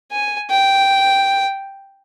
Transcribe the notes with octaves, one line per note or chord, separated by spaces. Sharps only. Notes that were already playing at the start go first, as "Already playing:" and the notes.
G#5
G5